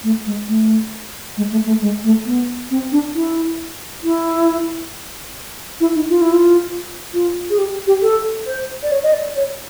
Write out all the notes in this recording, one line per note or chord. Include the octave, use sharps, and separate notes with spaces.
A3
G#3
A3
G#3
A3
A3
G#3
A3
B3
C4
D4
E4
E4
E4
D#4
F4
E4
F4
F4
G#4
G4
G4
A4
C5
D5
C#5
D#5
D5
C#5